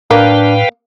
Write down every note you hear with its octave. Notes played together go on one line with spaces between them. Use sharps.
A2 A#3 D4 B4 F5 G5